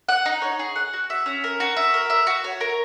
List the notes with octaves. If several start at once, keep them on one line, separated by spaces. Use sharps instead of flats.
F#5
D#4
C#5
G#4
F#5
F#4
E5
C#4
A#4
F#4
E5
A#4
E5
F#4
C#5
A#4